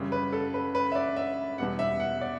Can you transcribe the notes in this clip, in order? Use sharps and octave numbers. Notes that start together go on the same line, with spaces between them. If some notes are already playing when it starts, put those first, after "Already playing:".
Already playing: F#2 C#3 G3
B4
A4
B4
B4
E5
D5
E5
E2 B2 G3 F#5
E5
F#5
D5